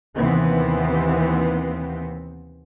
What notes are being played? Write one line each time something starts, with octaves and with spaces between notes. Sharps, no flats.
D#2 C3 E3 B3 C4